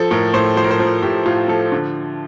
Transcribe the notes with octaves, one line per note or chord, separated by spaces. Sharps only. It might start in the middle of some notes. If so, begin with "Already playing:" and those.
Already playing: F3 A4
A2 A#4
A2 C5
F3 C5
A#4
C5
F3 A#4
A2 G4
A2 F4
F3 A4
D3